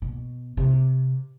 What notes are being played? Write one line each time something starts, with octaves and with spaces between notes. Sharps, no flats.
B2
C3